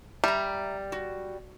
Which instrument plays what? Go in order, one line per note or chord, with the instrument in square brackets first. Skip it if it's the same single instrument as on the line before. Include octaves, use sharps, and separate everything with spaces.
[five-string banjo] G3 [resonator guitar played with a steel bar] E5 A#5
[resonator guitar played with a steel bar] F#4